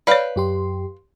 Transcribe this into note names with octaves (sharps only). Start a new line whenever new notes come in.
B4 C#5 D5 F5 G5
F#2 G4 C6